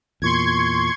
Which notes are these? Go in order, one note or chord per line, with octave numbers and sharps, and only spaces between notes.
E2 A#2 C6 C#6 G#6